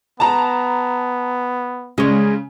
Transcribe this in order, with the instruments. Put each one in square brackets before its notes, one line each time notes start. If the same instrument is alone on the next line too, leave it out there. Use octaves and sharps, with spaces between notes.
[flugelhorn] B3 [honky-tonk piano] A5 A#5
[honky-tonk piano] C#3 [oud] G#3 C#5